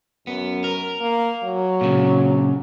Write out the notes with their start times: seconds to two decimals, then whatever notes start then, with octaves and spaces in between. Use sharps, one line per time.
0.27 F#2 B3
0.64 A#4
1.00 A#3
1.44 F#3
1.81 A#2 C#3